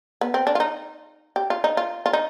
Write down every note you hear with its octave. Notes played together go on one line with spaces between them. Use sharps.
B3
C4
D4
F4
D#4
G4
F4
D#4
F4
F4
D#4